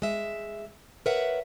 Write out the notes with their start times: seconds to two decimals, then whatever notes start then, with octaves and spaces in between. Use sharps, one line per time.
0.02 G#3 E5
1.06 A#4 B4 C#5 E5 F#5